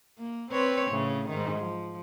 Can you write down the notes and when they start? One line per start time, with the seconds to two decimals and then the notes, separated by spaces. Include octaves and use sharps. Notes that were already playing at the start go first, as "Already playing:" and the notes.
0.18 A#3
0.52 C4 B4 C#5
0.91 A2 C#3
1.29 G#2 D#3
1.59 F3